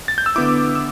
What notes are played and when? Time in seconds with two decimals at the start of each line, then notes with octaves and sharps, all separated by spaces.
0.08 A6
0.18 G6
0.26 E6
0.36 D3 B3 E4 D6
0.75 E6